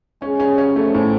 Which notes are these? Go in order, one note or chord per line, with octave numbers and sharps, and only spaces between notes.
G#3 C#4
G3 C#4
F#3 C#4
F3 A3
A2 E3 F3